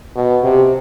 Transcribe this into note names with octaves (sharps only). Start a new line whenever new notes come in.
B2
C3